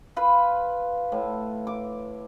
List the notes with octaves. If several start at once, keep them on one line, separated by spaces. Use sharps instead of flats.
F4 B4 B5
A2
D6